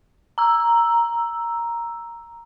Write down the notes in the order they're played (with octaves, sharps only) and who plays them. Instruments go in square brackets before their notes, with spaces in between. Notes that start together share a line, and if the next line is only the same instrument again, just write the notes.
[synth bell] A#5 E6